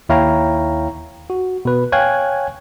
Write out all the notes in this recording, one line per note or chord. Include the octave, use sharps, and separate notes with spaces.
D#2 E4 C#5 F5 G5 A#5
F#4
B2 B4
C#5 F5 G5 G#5 F#6 G#6